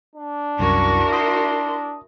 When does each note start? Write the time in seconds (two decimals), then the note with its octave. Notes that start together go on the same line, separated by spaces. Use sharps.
0.15 D4
0.59 C2 F#2 E4 F#4 A#4 C#6
1.12 C6 D#6